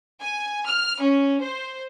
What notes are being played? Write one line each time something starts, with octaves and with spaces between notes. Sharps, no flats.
G#5
F6
C#4
C5